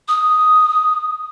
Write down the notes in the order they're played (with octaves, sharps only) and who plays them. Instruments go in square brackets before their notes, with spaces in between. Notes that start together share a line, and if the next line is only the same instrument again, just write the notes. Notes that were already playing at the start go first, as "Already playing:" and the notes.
[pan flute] D#6